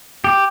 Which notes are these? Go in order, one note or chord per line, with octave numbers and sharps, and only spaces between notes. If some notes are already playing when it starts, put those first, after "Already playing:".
G4